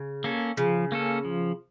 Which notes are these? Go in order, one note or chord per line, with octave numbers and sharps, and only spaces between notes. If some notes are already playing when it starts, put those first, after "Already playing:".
Already playing: C#3
A#3 C#4 A4
C#3 F3
A#3 C#4 A4
F3